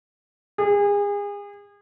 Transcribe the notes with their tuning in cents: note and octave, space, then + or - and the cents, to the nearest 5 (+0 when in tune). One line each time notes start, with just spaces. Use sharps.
G#4 -35